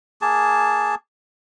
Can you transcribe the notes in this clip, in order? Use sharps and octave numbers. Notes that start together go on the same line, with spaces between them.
A#3 G#4 A5